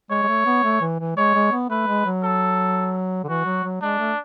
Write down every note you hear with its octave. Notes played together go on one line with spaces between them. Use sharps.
G#3 C#5
G#3
A3
B3
A3
E3
E3
G#3 C#5
G#3
B3
A3 B4
G#3
F#3
A4
D3
E3 F#4
F#3
F#3
G#3 D4
A3